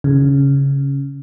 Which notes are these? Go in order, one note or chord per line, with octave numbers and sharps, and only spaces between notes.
C#3